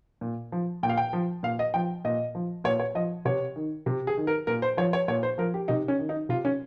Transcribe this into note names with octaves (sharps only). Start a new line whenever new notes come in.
A#2
F3
A#2 G5
F5
G5
F3
A#2 F5
D#5
F3 G5
A#2 D#5
F3
A#2 C#5
C#5
F3 D#5
C3 C#5
D#3
C3
G#4
D#3
A#4
A#2 A#4
C5
F3 C#5
C#5
A#2 C#5
C5
F3 A#4
G4
C3 D#4
C#4
D#3
D#4
C3 F4
C#4